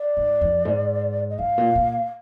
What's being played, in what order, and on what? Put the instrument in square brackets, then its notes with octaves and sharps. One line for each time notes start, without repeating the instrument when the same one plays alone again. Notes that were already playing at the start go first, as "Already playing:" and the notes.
Already playing: [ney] D5
[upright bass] G#2
F2
G#2
[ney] D#5
[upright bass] G#2 [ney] F5
[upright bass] A#2
A#2